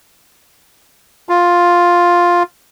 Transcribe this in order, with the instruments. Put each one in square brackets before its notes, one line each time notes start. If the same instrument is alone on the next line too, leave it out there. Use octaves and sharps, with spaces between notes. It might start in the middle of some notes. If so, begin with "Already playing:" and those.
[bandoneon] F4